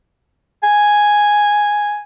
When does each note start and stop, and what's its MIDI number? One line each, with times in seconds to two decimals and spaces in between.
0.63 2.02 80